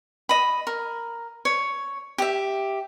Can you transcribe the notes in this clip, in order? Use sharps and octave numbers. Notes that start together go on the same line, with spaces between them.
D#5 B5
A#4
C#5
G4 E5